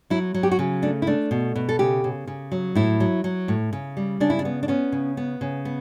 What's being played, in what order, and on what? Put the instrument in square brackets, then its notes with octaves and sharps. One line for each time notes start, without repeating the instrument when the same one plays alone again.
[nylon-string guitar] F#3 E4
F#3
G4
F#4
C#3
A3 D4
E4
A3 D4
B2
B2
A4
C#3 G4
C#3
C#3
F#3
A2 E4
F#3
F#3
A2
C#3
G3
C#3 D4
E4
D4
B3
D4
B3 C#4
C#3
B3
C#3
B3